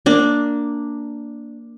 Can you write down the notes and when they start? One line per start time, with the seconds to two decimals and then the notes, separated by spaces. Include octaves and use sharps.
0.06 A#3 D4